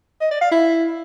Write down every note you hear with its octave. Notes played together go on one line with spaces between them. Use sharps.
D#5
D5
F5
E4